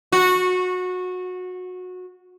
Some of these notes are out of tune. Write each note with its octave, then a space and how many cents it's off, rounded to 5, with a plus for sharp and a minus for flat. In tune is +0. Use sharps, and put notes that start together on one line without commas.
F#4 -20